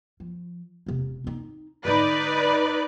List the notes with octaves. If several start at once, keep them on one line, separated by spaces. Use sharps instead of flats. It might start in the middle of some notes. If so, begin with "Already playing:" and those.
F3
E1 C3
C4 D#4
G#2 D3 D#4 B4 D5